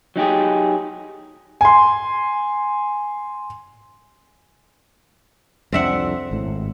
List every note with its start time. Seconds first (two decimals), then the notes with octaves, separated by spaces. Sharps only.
0.16 F#3 D#4 G4 G#4
1.61 G#5 C6
5.72 C2 F2 C4 D4 E5 F#5
6.31 G#1 A2